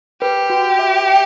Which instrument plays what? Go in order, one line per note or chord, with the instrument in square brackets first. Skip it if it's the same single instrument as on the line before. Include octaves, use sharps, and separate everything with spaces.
[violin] G4 [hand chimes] B4
[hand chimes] F#4
E5
G5